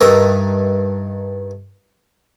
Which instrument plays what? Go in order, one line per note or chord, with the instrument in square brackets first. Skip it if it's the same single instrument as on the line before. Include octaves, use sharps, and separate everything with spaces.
[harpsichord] G2 D#3 A#4 E5